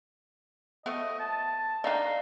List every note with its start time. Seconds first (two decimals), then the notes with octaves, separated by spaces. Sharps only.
0.86 F3 A3 B3 D#5
1.19 A5
1.84 D4 D#4 D5 F5 A#5